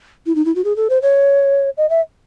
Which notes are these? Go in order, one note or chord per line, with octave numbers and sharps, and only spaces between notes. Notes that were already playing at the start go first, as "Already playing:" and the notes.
E4
D#4
E4
F#4
G#4
A4
C5
C#5
D#5
E5